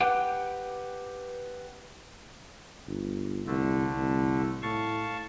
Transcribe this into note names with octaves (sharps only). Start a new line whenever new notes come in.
G4 B4 F#5 G5
G1
C2 D3 A3
C2
A2 F5 A5 C#6